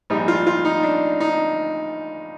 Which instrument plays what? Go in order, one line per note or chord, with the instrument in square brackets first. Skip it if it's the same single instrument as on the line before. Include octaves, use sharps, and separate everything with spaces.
[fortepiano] A#1 G#2 G3 D#4
F4
F4
D#4
D4
D#4